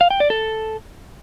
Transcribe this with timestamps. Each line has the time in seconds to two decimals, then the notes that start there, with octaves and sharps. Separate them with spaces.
0.01 F5
0.10 G5
0.20 D5
0.30 A4